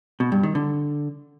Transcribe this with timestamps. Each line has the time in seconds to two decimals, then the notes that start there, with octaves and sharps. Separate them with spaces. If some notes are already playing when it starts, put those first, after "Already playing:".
0.20 B2
0.32 G2
0.43 D#3
0.55 D3